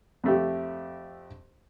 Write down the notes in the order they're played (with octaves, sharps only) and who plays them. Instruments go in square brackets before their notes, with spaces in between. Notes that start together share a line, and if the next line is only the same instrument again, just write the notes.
[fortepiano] F2 A3 G4